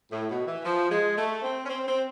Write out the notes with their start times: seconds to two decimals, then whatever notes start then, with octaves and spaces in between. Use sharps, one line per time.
0.11 A2
0.30 B2
0.47 E3
0.65 F3
0.90 G#3
1.16 A3
1.42 C4
1.64 C#4
1.69 C4
1.87 C4